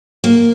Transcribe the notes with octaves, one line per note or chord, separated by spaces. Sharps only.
A#3